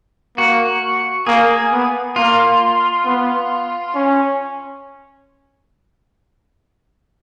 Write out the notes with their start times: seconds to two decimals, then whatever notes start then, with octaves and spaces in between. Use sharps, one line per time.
0.37 A#3 F#4
1.27 A#3 G#4
1.72 B3
2.16 A#3 F4
3.05 B3
3.95 C#4